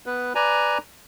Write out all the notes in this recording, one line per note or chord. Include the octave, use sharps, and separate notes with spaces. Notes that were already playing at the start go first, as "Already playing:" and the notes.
B3 B4
B4 D5 G#5 A#5